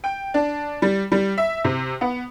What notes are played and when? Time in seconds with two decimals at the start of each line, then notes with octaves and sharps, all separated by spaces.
0.04 G5
0.34 D4
0.82 G3
1.12 G3
1.38 E5
1.64 C3
2.01 B3